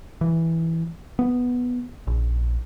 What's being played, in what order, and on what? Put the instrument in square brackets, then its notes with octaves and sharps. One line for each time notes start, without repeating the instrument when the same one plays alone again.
[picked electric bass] E3
B3
A#1